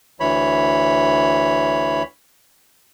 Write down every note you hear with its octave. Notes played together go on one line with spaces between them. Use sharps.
D2 E3 C#5 B5